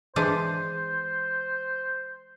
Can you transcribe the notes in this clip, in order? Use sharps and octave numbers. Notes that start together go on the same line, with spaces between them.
E3 G#3 D4 C5